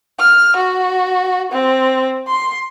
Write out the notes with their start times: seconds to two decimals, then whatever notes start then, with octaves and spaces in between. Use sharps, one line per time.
0.19 F6
0.56 F#4
1.52 C4
2.28 C6